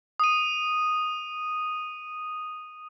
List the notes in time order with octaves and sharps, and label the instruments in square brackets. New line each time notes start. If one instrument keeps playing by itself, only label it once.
[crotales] D#6 D#7